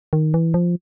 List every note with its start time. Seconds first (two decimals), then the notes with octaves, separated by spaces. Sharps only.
0.13 D#3
0.34 E3
0.54 F3